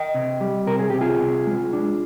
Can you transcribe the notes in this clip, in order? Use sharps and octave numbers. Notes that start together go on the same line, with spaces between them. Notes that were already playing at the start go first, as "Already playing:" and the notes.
Already playing: D#5 G5
C3
G3
C3 A#4
G#4
C3 G4
F4 G#4
C3
G#3
D4